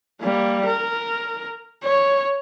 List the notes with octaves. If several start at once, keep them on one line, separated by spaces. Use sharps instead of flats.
G3 A#3
A#4
C#5